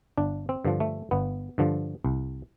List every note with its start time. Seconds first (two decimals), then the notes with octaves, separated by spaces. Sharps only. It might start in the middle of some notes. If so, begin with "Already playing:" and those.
0.18 G1 D4
0.49 C4
0.65 G2 D3 F3
0.80 A3
1.11 G1 B3
1.58 G2 D3 F3
2.05 C2